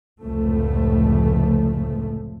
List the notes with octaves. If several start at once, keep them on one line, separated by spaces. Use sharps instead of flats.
F1 C#2 A2 F3 A3